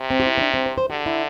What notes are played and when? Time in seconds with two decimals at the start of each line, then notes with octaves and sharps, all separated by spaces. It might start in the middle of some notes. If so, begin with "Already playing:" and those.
Already playing: C3
0.10 C4
0.20 G4
0.26 E4
0.38 C4
0.41 D4
0.54 C4
0.66 C5
0.78 C5
0.90 D3 G4
1.06 E4